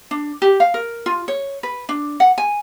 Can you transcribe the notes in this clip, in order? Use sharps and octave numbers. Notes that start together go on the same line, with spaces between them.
D4
G4
F5
A#4
F4
C#5
B4
D4
F#5
G#5